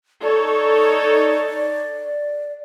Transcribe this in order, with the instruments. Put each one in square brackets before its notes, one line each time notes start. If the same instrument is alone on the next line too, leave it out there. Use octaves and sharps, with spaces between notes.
[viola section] D#4 A4 C#5 [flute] D5